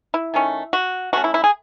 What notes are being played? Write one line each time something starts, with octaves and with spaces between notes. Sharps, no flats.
E4
D#3 A3 C#4
F#4
E3 A3 C#4 F#4
E4
E4
G#4